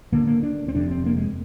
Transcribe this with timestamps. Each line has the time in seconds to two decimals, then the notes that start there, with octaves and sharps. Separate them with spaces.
0.12 D2 D3 A#3
0.27 A#3
0.43 D4
0.68 C4
0.75 F1 F2 C3 D4
0.91 C4
1.06 A#3
1.17 G#3